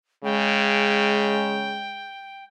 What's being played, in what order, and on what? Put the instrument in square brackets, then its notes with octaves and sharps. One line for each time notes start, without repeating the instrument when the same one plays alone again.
[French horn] C#3 [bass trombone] G#3 [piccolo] G5